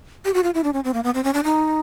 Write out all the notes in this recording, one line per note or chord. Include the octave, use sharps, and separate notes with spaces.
G4
F#4
F4
E4
D4
C#4
C4
A#3
B3
C4
C#4
D4
D#4